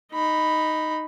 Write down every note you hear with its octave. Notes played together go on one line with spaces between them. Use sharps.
D#4 B5